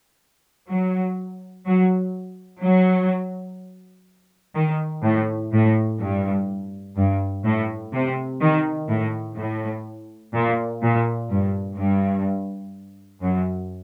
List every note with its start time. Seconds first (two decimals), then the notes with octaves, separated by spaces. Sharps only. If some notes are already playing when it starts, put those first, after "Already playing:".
0.70 F#3
1.66 F#3
2.63 F#3
4.56 D#3
5.03 A2
5.52 A2
6.00 G2
6.97 G2
7.44 A2
7.93 C3
8.40 D#3
8.89 A2
9.37 A2
10.34 A#2
10.82 A#2
11.30 G2
11.77 G2
13.22 F#2